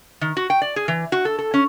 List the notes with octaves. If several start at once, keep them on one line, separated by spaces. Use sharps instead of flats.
D#3
F#4
G5
D5
G#4
E3
F#4
A4
A4
C#4